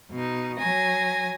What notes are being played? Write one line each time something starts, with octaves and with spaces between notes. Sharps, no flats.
B2 D#4
F#3 G#5 A#6